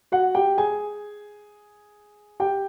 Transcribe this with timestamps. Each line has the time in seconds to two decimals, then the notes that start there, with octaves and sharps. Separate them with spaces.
0.12 F#4 F#5
0.35 G4 G5
0.57 G#4 G#5
2.40 G4 G5